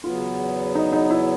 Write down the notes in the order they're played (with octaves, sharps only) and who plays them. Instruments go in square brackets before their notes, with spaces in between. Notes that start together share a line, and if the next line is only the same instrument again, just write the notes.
[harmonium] E2 C#3 F#3 B3 [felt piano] F4
[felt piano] D#4
D#4
E4